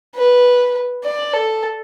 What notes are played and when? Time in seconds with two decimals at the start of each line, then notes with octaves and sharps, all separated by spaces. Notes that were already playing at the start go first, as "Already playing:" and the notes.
0.16 B4
1.04 D5
1.33 A4